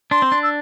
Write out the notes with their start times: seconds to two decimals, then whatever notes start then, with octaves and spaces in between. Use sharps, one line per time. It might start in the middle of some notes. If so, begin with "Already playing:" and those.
0.11 D4 C6
0.22 C4
0.32 D4
0.42 E6